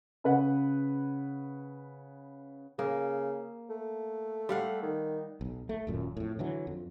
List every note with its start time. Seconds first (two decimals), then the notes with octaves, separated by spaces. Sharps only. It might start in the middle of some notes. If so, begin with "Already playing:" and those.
0.24 C#3 B4 F#5
2.79 C#3 A#3
3.70 A3
4.49 G3 F5 F#5
4.83 D#3
5.41 B1
5.69 A3
5.87 D#1 F#2 A#2
6.17 F2 A2
6.39 D3 E3 F#3
6.67 F2